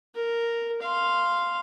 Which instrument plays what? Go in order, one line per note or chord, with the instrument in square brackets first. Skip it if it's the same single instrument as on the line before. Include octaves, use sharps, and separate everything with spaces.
[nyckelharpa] A#4
F5 C6